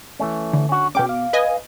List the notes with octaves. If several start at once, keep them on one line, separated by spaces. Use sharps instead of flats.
E3 A3 C#4
D3
C#4 F#4
B2 C#4 G#4 G5 D6
F5
B4 D#5 G#5